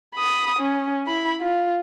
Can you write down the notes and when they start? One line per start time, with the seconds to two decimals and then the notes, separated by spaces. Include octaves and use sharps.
0.15 B5 D#6
0.59 C#4
1.07 E4 B5
1.41 F4